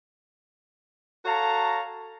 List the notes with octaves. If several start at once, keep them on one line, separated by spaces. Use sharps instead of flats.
F#4 A4 C#5 F5 A5 A#5